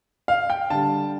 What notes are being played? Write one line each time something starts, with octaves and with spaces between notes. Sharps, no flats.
F5
G5
D3 G3 A5